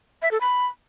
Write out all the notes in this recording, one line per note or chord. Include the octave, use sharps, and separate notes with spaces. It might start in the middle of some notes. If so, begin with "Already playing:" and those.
E5
A4
B5